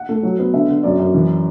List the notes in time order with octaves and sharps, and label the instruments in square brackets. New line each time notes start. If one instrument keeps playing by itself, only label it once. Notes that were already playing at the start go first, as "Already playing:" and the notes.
Already playing: [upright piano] F#5
A3
F#3
B3
D3 E5
D3
F#2 D5
F#2
E3